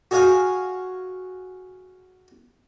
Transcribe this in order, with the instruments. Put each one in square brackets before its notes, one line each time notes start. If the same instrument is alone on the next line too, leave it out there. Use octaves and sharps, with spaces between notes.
[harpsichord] F#4 G#4 C#5 F5 F#5 G#5